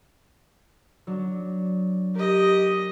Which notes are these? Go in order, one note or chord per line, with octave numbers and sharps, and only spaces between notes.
F#3 D4
G4 A#4 D#5